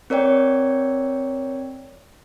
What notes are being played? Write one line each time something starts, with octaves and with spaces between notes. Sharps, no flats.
C4 A#4 C#5 D5 G5